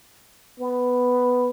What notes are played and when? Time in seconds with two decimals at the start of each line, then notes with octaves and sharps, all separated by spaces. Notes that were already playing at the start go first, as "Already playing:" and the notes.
0.60 B3